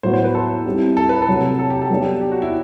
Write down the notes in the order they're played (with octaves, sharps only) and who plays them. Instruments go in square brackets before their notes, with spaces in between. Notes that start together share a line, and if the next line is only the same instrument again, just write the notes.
[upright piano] A2 F#3 B3 F#4 [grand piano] C5
[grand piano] C5
B4
A4
[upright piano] G3 C4 E4 G4
[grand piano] A4
B4
A4
[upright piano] C3 F#3 A3
[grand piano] A4
G4
A4
[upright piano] F#3 B3 D4 G4
[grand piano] G4
F#4
E4